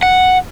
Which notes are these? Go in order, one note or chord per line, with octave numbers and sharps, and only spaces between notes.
F#5